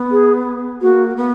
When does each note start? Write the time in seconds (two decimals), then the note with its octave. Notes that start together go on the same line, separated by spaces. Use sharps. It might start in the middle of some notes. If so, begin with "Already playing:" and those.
Already playing: B3
0.11 G#4
0.82 A#3 F#4
1.17 B3